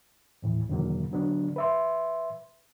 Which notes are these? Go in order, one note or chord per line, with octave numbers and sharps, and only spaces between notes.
D#2 A2 E3
E2 B2 D3 D#3 F#3 A#3
D3 F#3 B3 D4
B4 E5 C6